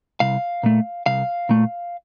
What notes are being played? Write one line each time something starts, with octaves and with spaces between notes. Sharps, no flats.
C2 F5
A#2 A3
C2 F5
A#2 A3